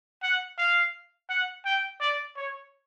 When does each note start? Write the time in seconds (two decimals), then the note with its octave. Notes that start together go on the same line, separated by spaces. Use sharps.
0.23 F#5
0.58 F5
1.30 F#5
1.65 G5
2.01 D5
2.36 C#5